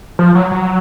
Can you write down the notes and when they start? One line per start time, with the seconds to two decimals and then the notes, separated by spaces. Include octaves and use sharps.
0.19 F3
0.35 F#3
0.51 F#3